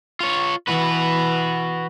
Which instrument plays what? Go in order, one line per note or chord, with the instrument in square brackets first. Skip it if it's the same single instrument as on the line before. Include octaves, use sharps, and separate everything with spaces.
[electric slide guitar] F4 C#5
[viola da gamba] E3 [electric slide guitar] F#4 B4